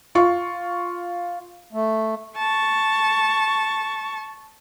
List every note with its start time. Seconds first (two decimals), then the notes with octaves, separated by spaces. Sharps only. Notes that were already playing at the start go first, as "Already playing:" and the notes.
0.15 F4 C#6
1.73 A3
2.38 A5 C#6